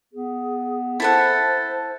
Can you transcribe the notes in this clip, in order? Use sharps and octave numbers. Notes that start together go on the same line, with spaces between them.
B3 G#4
E4 A4 C5 F#5 A5